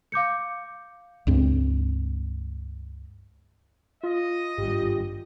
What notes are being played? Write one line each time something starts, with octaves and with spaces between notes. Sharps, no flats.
F5 D6 G6 C#7
C#2 G2 C4
F4 D#5
G#1 G2 G4